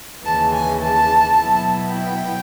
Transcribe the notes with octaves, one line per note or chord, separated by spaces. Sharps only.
D#2 C#3 E3 A5
G#5
A5
B2 F#3 B3 E4
G5